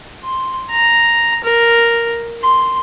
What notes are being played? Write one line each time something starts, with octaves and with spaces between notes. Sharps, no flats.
C6
A#5
A#4
C6